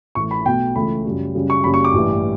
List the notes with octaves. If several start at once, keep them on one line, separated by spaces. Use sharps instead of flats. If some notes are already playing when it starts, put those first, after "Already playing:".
A1 A2 E3 A3 C#6
B5
B1 B2 A3 G5
C#2 C#3 E3 A3 B5
F#2 C#3 G3
F#2 C#3 G3
C#6
F#1 F#2 C#3 G3 B5
C#6
D6
A1 G2 E3 G3